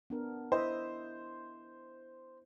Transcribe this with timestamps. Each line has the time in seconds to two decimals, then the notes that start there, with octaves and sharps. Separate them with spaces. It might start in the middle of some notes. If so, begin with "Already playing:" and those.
0.10 B3 D4 A#4
0.52 E4 C5 D#5 E5